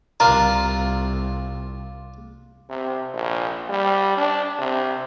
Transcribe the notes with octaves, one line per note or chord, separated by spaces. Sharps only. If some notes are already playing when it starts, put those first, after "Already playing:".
C2 D4 F4 A#4 A#5
C3
A#1
G3
D4
C3